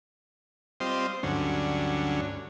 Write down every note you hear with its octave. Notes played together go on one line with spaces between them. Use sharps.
G3 C4 F4 C5 D#5
D2 G2 D3 F#3 C#4